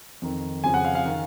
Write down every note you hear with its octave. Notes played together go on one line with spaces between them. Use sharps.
F2 D#3
F2 C#3 F3 G#5
F#5
F5
F5
D#3